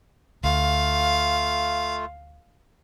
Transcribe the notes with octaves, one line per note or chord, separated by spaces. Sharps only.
D2 A3 F4 F5